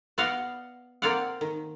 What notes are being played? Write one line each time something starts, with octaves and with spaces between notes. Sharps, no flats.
B3 D5 D#5 F5 F#5
A#3 C4 D5 F5 F#5
D#3